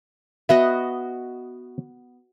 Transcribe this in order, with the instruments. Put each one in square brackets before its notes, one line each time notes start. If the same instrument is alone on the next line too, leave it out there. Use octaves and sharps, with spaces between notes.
[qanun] B3 F#4 D#5 [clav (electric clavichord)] E5